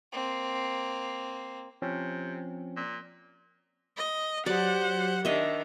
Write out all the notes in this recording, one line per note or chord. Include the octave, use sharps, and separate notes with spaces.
A#3 C4
C3 F3 C4 C#4
A#2
D#5
F#3 G4 C5 D5 F#5
D#3 D4 D#5 E5